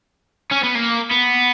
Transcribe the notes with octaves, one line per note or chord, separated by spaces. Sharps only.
C#4
B3
A#3
B3